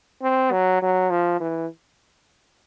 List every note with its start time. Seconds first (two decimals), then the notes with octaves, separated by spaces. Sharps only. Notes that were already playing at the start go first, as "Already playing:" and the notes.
0.22 C4
0.52 F#3
0.82 F#3
1.10 F3
1.40 E3